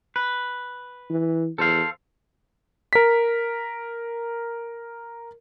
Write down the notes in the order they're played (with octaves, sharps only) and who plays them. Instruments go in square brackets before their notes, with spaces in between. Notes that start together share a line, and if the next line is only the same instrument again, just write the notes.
[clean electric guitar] B4
[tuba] E3
[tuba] E2 [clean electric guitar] A4 C5 F5
[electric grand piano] A#4 B6